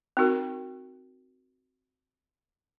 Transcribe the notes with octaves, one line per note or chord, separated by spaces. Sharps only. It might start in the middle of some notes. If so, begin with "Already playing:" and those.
C4 D#4 F#4 A#4